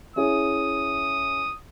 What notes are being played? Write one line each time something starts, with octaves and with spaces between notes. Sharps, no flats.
C#4 E4 G#4 D#6